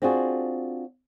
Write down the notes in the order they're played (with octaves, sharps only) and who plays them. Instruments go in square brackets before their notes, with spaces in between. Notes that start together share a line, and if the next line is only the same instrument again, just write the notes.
[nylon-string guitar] C4 D4 F4 F#4 G#4